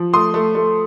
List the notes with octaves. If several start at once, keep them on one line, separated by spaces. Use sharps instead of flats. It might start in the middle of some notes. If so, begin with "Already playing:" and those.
Already playing: F3
A3 C6 D#6
A3
A3